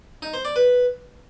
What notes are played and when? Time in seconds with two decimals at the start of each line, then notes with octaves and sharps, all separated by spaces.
0.22 D#4
0.34 C5
0.45 D5
0.56 B4